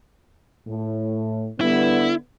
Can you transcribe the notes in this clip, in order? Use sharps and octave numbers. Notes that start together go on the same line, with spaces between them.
A2
D3 G3 B3 E4